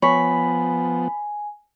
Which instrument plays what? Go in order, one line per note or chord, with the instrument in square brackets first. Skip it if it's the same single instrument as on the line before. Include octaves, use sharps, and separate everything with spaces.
[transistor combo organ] F3 B3 [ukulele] C#5 [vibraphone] G#5 [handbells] B5 B6